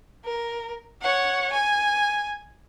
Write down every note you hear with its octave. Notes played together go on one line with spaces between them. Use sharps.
A#4
C#5 F#5
G#5